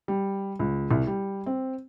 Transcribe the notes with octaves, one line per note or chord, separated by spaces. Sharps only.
G3
C#2
C2
G3
C4